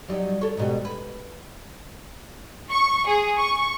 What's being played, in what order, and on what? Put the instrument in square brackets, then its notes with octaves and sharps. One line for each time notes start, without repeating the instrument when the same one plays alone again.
[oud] F#3 G3 D#4
A4 C#5
G#2 B2 G3
B4
[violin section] C#6
G#4
C#6